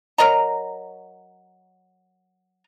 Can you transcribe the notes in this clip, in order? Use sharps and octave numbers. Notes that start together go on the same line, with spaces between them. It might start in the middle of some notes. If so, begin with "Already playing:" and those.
F#3 A#4 D#5 A#5